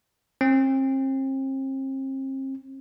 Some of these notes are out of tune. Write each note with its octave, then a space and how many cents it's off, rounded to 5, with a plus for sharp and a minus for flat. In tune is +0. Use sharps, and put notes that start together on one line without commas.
C4 +40